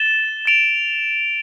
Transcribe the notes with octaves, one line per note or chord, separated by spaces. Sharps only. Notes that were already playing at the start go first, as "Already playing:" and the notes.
Already playing: A6 E7 G7
A6 D7 F7